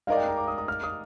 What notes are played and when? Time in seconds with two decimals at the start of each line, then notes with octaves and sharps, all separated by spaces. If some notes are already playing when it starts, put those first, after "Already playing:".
0.07 G#3 D#4 A#4 D5 F5
0.17 G5
0.28 A#5
0.37 D6
0.47 D#6
0.58 D#6
0.68 F6
0.83 D#6